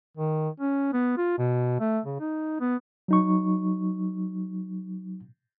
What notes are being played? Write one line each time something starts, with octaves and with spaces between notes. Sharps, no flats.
D#3
C#4
B3
F4
B2
A3
C#3
D#4
B3
F#3 D#4 C#6